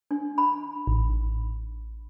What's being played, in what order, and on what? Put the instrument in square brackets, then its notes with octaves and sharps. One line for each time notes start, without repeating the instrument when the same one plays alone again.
[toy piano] D4
B5
[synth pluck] A1